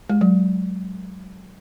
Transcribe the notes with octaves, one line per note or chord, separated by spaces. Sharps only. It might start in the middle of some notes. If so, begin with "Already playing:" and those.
G#3
F#3